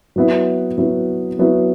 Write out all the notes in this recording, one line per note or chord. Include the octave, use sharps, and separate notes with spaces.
F#3 B3 E4
F#3 B3 E4
F#3 B3 E4